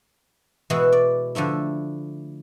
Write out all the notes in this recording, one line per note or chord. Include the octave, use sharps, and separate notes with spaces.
B2 E3 G#3 E4 F#4
D5
D3 F3 A3 E4